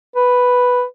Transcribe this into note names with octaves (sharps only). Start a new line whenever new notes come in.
B4